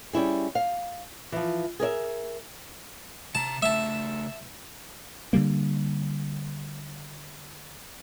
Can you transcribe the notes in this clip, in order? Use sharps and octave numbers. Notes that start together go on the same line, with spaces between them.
G3 C#4 E4 G#4
F5
E3 F3
G#4 A#4 D5 E5
C3 A5 A#5
C#3 A3 E5 A5
D3 F3 G3 A#3